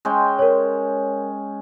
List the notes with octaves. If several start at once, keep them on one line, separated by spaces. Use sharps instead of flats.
G#3 C#4 G5
A#4 C#5